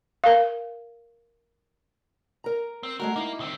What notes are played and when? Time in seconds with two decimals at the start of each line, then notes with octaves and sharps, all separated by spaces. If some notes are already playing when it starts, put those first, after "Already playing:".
0.24 A#4 F5
2.44 A#4 A#5
2.83 C4
3.00 G#3 A3 F#4 A#4
3.16 A#3 D#4 E4
3.40 D#3 C4